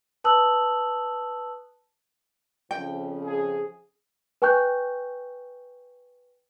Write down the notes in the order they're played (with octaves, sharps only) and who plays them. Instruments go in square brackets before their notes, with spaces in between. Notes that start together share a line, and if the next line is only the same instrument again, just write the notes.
[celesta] B4 A5 D#6 E6 F#6 F#7
[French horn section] F2 C#3 F3 [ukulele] G5
[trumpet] G#4
[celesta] B4 G5 G#5 C#6 F#6 G6